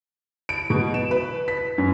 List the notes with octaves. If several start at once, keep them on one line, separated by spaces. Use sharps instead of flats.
D7
B2
E7
B4
B6
F#2